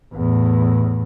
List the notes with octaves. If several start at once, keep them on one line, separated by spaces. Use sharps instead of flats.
E2 A2